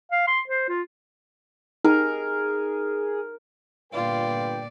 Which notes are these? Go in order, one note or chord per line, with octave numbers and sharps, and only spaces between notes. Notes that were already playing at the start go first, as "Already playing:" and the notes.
F5
C6
C5
F4
D#4 G#4 A#4
G1 A#2 F4 B4 D5 G5